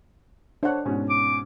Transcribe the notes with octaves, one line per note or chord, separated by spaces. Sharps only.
D4 C5 C#5 F#5
G#2 B2 C#4
D6